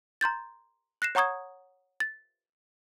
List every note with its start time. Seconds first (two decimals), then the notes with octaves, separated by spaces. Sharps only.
0.21 A#5 C6 G6 A6
1.02 F#6 A#6 C7 E7
1.15 C#5 F#5 A#5 C#6 D#6 G#6
2.00 A6